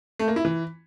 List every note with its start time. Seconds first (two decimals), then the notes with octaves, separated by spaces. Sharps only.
0.19 A3
0.28 A#3
0.36 E4
0.45 E3